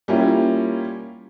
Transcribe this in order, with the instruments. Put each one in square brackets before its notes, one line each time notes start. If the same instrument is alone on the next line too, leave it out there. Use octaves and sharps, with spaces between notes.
[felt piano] G3 A#3 C#4 E4 F4